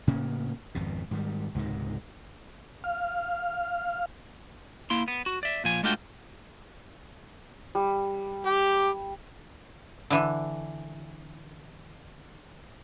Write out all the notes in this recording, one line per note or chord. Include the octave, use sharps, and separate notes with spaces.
A2 C#3 A#3 C#4
G#1 F2 B2
G#2 D#3 G3
C#2 G#2 C3 D#3
F5
A#3 E4 C6
B3
F#4
D5 E5
A#2 F3 G#5
G#3 A3 D4 F4 F#4 G5
G3
G4
D3 E3